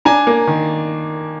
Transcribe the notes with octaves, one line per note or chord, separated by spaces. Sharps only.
D4 G#5 A#5
A#3
D#3